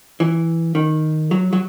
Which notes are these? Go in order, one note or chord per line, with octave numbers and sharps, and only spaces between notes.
E3
D#3
F#3
F#3